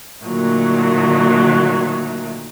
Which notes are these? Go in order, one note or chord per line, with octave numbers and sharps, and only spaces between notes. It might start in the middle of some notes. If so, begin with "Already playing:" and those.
A#2 D3 D#3 F#3 A3 A#3